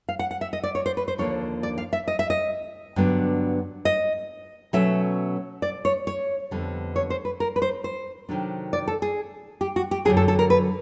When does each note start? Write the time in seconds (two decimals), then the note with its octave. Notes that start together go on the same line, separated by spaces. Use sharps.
0.09 F5
0.19 F#5
0.31 F#5
0.41 E5
0.53 D#5
0.63 D5
0.75 C#5
0.86 C5
0.97 B4
1.08 C5
1.18 D#2 D3 F3 A#3 D4 C#5
1.63 D5
1.78 F5
1.93 E5
2.08 D#5
2.19 E5
2.30 D#5
2.96 G2 D3 F#3 B3 D4
3.85 D#5
4.73 B2 F#3 A3 C#4 E5
5.62 D5
5.85 C#5
6.07 C#5
6.51 F2 D3 G3 B3
6.96 C#5
7.10 C5
7.25 B4
7.40 A#4
7.56 B4
7.62 C5
7.84 C5
8.29 C3 D#3 F#3 A3 D4
8.73 D5
8.88 A4
9.02 G#4
9.61 G4
9.76 F#4
9.91 G4
10.05 F#2 D3 F#3 G#4
10.17 A4
10.28 A4
10.39 A#4
10.50 B4